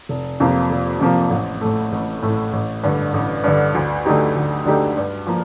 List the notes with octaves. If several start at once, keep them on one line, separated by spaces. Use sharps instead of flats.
F1
F2 C3 F3 A#3
F1
F2 C3 F3 A#3
A1
A2 A3
A1
A2 A3
A1
G2 D3
A1
G2 D3
D2
D3 A3 D#4 G4
D2
D3 A3 D#4 G4
G2
F3 A#3